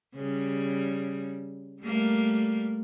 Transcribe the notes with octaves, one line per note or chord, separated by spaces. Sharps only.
C#3 G3
G3 A3 A#3